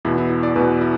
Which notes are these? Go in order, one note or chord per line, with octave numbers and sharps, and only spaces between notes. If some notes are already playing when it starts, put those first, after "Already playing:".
E2 B2 B3 E4
E4
E4
D5
E2 B2 B3 B4
E4